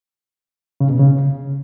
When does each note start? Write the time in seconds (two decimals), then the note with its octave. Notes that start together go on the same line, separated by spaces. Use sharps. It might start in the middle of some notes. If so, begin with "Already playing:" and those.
0.80 C#3
0.90 B2
0.99 C#3